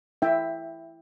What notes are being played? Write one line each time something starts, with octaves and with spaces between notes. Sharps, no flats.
E4 E5 G5